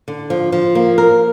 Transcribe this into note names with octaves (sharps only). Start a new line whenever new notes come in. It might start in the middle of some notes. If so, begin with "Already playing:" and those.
D3
F3
F3
A#3
A#4